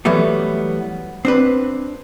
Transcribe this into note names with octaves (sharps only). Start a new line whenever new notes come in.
E3 F#3 G3 A3 B3
C4 D4 B4